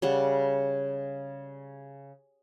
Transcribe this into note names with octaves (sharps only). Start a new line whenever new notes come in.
C#3 G3 F#5